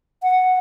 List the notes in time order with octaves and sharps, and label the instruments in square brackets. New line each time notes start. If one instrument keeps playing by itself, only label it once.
[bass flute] F#5